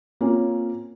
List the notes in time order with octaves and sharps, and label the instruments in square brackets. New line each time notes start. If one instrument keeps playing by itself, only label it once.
[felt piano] A#3 C4 C#4 F4